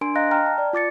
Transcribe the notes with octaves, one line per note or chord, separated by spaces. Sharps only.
D4 A#4 G#5 C6 D7
D#5 F5 A#5 F#6 A#6
G5 A#5 F6
A5
D5
F4 D6 A6 C#7